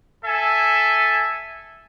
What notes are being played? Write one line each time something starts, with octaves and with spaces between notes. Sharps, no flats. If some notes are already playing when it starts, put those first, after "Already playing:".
A4 E5 G#5